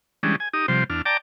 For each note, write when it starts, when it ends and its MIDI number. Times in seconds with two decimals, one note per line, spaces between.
0.23 0.36 52
0.23 0.36 55
0.23 0.36 56
0.23 0.36 61
0.23 0.36 62
0.40 0.49 80
0.53 0.66 63
0.53 0.66 67
0.53 0.66 87
0.68 0.84 48
0.68 0.84 53
0.68 0.84 55
0.68 0.84 72
0.90 1.02 40
0.90 1.02 62
0.90 1.02 89
1.06 1.17 74
1.06 1.17 79
1.06 1.17 81
1.06 1.17 82
1.06 1.17 86